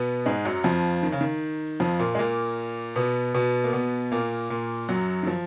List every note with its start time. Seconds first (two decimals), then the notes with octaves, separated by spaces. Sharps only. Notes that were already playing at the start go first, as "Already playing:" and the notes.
Already playing: B2 B3
0.26 G#2 G#3
0.45 F#2 F#3
0.64 F2 F3
1.03 D#3
1.12 C#3
1.21 D#3
1.80 F2 F3
1.99 A#2 A#3
2.15 G#3
2.19 A#2 A#3
2.96 B2 B3
3.35 B2 B3
3.64 A#3
3.73 B2 B3
4.12 A#2 A#3
4.50 A#2 A#3
4.89 F#2 F#3
5.23 D#3
5.27 F3